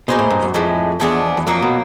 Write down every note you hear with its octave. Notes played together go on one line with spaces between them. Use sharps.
B2 A#3 D#4 G#4 C5
A2
G2
F#2
F2 A2 E3 G#3
E2 F3 G#3 B3 D4
E2
F2 F#3 A#3 D#4
B2